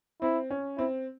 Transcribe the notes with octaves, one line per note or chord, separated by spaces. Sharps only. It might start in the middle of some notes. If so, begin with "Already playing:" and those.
C4 E4
C#4
C4 E4